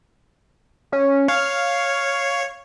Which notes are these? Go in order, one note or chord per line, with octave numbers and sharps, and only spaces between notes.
C#4
C#5 F5